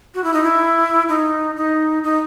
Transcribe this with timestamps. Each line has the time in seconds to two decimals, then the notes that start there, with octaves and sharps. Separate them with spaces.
0.15 F#4
0.24 E4
0.34 D#4
0.44 E4
1.09 D#4
1.57 D#4
2.03 D#4